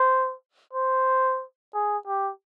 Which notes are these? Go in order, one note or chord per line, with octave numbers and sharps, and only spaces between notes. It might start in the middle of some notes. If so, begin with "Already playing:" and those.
Already playing: C5
C5
G#4
G4